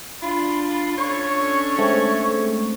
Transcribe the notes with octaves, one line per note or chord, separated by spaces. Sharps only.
D4 F4 B5
C#4 D4 A4 C#5 C#6
G#3 A3 C4